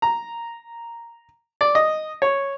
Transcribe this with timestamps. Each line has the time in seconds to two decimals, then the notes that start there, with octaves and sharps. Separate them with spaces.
0.02 A#5
1.61 D5
1.75 D#5
2.22 C#5